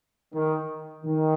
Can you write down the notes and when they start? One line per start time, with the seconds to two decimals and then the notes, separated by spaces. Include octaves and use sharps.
0.34 D#3
1.04 D#3